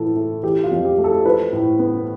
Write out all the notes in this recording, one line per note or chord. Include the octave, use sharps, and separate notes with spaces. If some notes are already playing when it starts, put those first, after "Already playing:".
Already playing: A2 E3 F3 A4
A3
E3 G4
F4
F2
G4
A3
A4
F3 B4
A2
B3